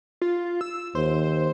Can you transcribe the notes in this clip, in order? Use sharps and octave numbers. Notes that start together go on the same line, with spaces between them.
F4
E6
D#2 C5